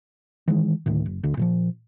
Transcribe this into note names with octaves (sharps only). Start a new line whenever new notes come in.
D#3 E3 G#3
D2 A2 D#3
F#1
D2 D3
A#2 E3 F3